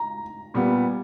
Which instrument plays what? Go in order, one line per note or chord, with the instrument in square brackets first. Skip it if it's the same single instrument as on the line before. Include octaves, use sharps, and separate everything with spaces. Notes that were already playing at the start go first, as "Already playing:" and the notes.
Already playing: [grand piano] A#5
[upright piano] A#2 G3 B3